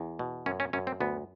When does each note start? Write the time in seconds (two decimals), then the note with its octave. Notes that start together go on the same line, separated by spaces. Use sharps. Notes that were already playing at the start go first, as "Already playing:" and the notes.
Already playing: E2
0.19 B2
0.46 F#2 C#4
0.60 C#4
0.73 F#2 C#4
0.87 C4
1.00 D2 B3